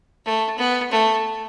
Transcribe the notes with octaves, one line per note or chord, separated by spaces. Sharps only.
A3
B3
A3